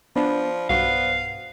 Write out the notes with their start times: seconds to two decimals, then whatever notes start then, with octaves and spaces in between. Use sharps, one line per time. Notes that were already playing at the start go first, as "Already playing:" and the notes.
0.16 F3 B3 D4 C5 D5 B5
0.69 B1 G2 B3 F#4 F5